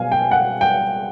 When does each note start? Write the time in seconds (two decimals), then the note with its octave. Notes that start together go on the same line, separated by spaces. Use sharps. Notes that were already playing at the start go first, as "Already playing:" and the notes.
Already playing: B2 F5 G#5
0.12 G5
0.31 F#5
0.61 G5